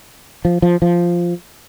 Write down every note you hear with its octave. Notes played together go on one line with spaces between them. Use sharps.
F3
F3
F3